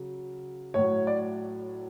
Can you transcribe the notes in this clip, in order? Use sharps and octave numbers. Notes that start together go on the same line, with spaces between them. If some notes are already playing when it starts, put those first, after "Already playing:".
Already playing: C#3 F#3
A2 F#3 C#5
D5